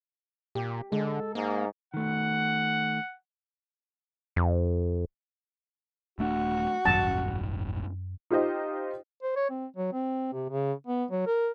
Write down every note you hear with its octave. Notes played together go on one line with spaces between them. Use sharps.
A#2 G4
D3 G#3 A4
G#2 A#3
D#3 A3 F#5
F2
D#1 A3 D4 F#4
D#1 G#1 F#2 C#4 A5
D#4 F4 G4 C5 D#5
C5
C#5
C4
F#3
C4
C3
C#3
B3
F#3
A#4